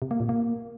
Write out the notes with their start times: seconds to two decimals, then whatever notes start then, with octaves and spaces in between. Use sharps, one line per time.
0.02 C3
0.11 A#3
0.20 A#2
0.29 A#3